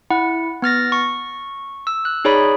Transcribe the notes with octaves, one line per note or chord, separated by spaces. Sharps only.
E4 F#5
B3 F6 A6 A#6
C#6
E6
F#6
D#4 G#4 C#5 D5 B5